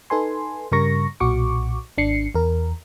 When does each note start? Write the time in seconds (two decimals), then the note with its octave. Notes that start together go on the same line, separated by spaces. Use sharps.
0.10 D#4 A4 B4 G#5 C6
0.72 G2 C#3 G3 A#4 C#6 A#6
1.20 B1 A#2 F#4 C#6 D6
1.98 G#1 D4 C7 C#7
2.35 E2 A#4